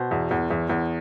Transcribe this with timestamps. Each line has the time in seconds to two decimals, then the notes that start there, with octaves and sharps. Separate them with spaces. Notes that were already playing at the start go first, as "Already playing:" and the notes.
Already playing: B2 C5
0.11 E2
0.31 E2
0.51 E2
0.70 E2